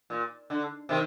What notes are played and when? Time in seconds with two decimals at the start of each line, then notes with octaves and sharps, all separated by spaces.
0.10 A#2
0.50 D3
0.89 C3 D#3